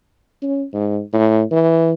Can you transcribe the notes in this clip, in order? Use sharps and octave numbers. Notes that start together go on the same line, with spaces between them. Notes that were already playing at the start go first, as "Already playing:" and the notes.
C#4
G#2
A2
E3